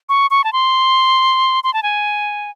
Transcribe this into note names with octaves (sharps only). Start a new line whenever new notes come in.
C#6
C#6
A5
C6
C6
A5
G#5